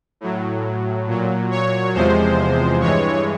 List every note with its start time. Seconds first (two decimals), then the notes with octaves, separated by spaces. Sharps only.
0.21 A2 F#3
1.07 A#2 F#3
1.51 C#5
1.94 E2 C3 F3 G#3 C5
2.81 G2 E3 G#3 C#5